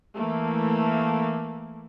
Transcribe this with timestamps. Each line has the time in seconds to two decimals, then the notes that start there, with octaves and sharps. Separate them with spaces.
0.16 E3 A3 A#3